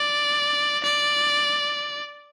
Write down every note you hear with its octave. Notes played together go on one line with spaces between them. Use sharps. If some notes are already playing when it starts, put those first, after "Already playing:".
Already playing: D5
D5